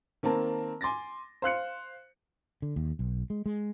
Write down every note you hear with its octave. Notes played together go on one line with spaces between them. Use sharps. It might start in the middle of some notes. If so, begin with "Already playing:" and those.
D#3 A#3 C4 A5
G#5 C6 D6 A6 A#6
C5 F5 F#6 C#7
D3
D#2
B1
G#3
G#3